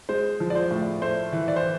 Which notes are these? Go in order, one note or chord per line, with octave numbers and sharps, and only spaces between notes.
G#3 C5
F3
D5
C5
A2
A3 C5
E3
D5
C5